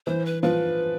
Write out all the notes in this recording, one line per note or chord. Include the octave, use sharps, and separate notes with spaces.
E3 C5
B4
F3 B4